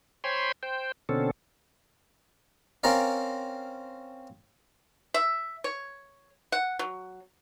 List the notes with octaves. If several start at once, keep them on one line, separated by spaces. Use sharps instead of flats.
C5 C#5 G5 G#5 B5 C6
C5 G5
B2 D3 C4 C#4 A4
C4 C#4 A#4 D5 F5
E5
C#5
F#5
F#3